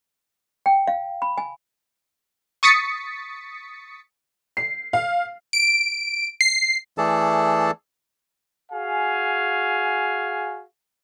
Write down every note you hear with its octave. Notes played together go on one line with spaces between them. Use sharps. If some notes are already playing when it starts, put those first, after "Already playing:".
G5
F5
B5
G#5
C#6 D#6 A6 B6 C#7
C7
F5
D7
C7
E3 A3 G#4 A4 D5 A5
F#4 G#4 F5 G#5